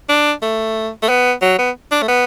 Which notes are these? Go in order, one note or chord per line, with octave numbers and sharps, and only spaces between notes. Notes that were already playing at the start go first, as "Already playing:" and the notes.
D4
A3
A3
B3
F#3
B3
D4
A3
B3